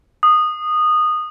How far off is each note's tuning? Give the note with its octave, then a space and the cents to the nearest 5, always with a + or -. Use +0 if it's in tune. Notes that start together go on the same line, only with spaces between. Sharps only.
D#6 -15